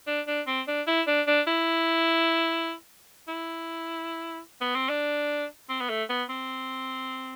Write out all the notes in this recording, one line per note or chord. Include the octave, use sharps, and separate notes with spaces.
D4
D4
C4
D4
E4
D4
D4
E4
E4
B3
C4
D4
C4
B3
A3
B3
C4